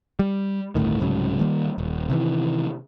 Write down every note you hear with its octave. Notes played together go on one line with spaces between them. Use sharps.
G3
G1 D2 A2 D#3
C2 G#2 C#3 F#3
D#3 G3 A#3
D#1
C3 D#3 E3